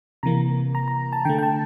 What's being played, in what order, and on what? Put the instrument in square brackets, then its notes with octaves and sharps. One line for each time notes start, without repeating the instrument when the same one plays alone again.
[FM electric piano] C3 E3 A#3 A#5
A#5
A#5
A5
D3 A3 G5
G5
A5